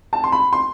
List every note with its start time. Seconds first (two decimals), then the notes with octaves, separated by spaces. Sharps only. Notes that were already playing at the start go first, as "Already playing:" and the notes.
0.13 A5
0.24 C6
0.32 B5
0.53 C6